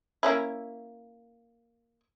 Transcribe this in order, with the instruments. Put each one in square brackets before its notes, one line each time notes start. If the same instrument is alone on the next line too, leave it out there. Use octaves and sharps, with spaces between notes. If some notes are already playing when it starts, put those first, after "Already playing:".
[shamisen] A#3 C#4 E4